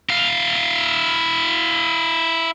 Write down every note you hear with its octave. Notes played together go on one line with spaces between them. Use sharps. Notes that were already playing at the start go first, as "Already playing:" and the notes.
E4 F5